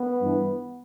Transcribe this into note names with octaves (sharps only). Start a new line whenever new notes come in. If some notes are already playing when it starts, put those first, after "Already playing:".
Already playing: B3
G2 E3